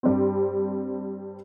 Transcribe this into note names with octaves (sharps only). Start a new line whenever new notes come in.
G2 G3 C4